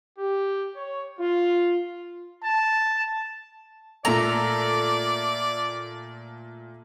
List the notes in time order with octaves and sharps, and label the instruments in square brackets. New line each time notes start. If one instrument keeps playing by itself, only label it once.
[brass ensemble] G4
C#5
F4
[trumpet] A5
[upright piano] A#2 A3 A4 [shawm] D5 [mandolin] A#5